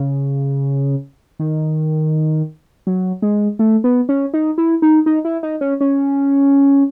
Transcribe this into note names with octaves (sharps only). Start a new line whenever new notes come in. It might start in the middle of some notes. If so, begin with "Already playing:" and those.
Already playing: C#3
D#3
F#3
G#3
A3
B3
C#4
D#4
E4
D#4
D#4
E4
D#4
C#4
C#4